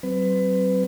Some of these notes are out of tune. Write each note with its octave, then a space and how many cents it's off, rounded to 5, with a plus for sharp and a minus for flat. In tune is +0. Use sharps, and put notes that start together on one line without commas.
F#3 +40 C4 +0 B4 +25